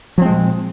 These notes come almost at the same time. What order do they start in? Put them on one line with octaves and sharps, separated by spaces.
F3 C4 G#3 A#2